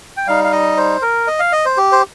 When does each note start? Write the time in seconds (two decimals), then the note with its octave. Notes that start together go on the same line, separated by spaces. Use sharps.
0.17 G5
0.27 G3 D#4 F5
0.44 F5
0.52 D#5
0.77 C5
1.02 A#4
1.27 D#5
1.39 F5
1.52 D#5
1.65 C5
1.77 G4
1.92 C5